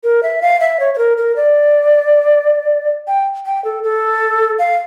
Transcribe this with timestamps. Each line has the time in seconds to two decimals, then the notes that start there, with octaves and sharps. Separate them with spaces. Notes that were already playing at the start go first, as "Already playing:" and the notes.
0.04 A#4
0.23 E5
0.42 F5
0.61 E5
0.80 C#5
0.94 C#5
0.98 A#4
1.18 A#4
1.36 D5
3.07 G5
3.46 G5
3.64 A4
3.83 A4
4.59 F5